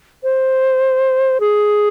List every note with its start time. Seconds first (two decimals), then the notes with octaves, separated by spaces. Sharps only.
0.23 C5
1.40 G#4